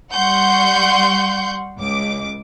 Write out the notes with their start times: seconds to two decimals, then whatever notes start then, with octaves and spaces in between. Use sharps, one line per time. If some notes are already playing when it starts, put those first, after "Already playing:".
0.13 G3 F#5 C6 C#6 G6
1.78 C#2 D6